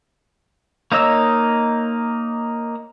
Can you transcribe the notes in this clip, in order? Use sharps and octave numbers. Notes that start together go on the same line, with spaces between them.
A#3 D#4 C#5 D#5 E6